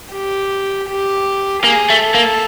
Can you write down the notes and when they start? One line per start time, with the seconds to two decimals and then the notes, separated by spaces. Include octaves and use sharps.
0.12 G4
0.88 G4
1.64 A#3 G#4
1.90 A3
2.02 A4
2.14 A#3